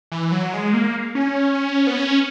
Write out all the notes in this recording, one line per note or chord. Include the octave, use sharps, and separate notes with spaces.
E3
F#3
G#3
A#3
C#4
B3
C#4